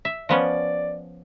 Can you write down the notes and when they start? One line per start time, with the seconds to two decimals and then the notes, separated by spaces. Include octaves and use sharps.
0.05 E5
0.29 F3 B3 C#4 D5